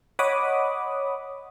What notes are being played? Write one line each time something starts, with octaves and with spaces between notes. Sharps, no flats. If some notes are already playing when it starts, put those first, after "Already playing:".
C#5 D#5 F#5 B5 D6 D#6